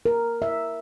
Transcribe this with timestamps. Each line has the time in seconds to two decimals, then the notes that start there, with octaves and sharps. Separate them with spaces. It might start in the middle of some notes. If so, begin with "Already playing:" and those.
0.05 A#4
0.42 E5